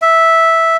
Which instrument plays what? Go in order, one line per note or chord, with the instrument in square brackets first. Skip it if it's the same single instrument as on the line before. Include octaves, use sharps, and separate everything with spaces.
[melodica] E5